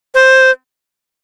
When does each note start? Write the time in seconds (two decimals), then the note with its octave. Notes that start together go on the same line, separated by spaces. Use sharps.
0.15 C5